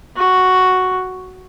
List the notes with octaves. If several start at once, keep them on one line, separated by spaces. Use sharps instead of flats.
F#4